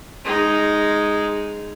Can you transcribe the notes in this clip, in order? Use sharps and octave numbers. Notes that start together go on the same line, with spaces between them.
G#3 D#4